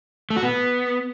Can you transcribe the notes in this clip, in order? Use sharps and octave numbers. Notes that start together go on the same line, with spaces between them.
A3
F#4
B3